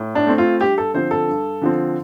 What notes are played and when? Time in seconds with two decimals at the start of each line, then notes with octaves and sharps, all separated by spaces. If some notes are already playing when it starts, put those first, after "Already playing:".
Already playing: A2
0.15 D4
0.26 A3 C4
0.38 F4
0.61 G2 G4
0.78 A4
0.94 D3 F3 C4 C5
1.11 A4
1.28 G2
1.62 D3 F3 C4